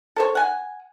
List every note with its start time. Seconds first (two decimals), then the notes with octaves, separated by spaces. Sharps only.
0.16 A4 C5 C#5
0.35 F#5 G#5